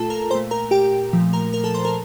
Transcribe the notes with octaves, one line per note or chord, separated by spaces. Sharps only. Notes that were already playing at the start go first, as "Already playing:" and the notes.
Already playing: A#2 A3 F4 A4 A5
A#4 A#5
A#2 A3 C5 C6
A#4 A#5
G4 G5
A#2 F3 A3
A#4 A#5
A#4 A#5
A4 A5
C5 C6
A#4 A#5